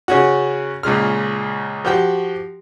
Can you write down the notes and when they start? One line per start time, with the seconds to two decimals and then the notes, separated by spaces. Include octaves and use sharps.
0.08 C#3 C#4 F#4
0.83 C#2 A#2 C#3 F6
1.85 F3 F#4 G4 G5